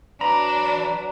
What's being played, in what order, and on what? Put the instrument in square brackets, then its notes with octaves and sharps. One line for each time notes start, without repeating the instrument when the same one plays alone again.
[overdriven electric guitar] E3 B5 [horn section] F#3 B4 [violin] D4 [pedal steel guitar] A#5